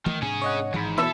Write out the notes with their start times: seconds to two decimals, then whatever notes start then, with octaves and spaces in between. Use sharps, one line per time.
0.06 D#3 E3 A3
0.22 G#2 C3 C#4 D4 G#4
0.42 C#5 D#5 F#5
0.74 G#1 G#2 E3 B5
0.98 B2 E4 A4 E5